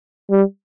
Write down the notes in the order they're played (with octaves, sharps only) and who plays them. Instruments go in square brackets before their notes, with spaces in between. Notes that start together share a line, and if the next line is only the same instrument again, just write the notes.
[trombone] G3